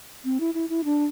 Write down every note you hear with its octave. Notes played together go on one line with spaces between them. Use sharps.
C4
E4
E4
E4
D4